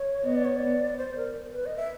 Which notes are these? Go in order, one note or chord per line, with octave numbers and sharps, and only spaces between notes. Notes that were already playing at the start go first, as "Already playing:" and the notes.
Already playing: C#5
B3 D#5
D5
C#5
D5
C5
A#4
B4
D#5
E5